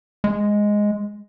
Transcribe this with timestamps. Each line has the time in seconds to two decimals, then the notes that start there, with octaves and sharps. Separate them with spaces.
0.24 G#3